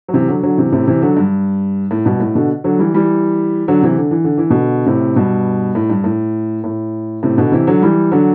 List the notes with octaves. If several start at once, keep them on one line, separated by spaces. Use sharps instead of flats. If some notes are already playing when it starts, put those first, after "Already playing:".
F#3
C3 E3
D3 F#3
D3 F#3
C3 E3
A2 C3
C3 E3
D3 F#3
G2
A2
G2 B2
A2
B2 D3
D3 F#3
E3 G3
E3 G3
D3 F#3
C3 E3
D3
E3
D3
E3
B2 D3
A2 C3
G2 B2
A2
G2
A2
A2
A2 C3
B2 D3
C3 E3
D3 F#3
E3 G3
D3 F#3